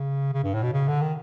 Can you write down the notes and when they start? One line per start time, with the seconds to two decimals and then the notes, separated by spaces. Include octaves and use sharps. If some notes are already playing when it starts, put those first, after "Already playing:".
Already playing: C#3
0.33 C#3
0.43 G2
0.54 A2
0.63 B2
0.73 C#3
0.88 D3
1.01 D#3